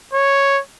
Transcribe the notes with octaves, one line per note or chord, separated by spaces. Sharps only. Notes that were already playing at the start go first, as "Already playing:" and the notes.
C#5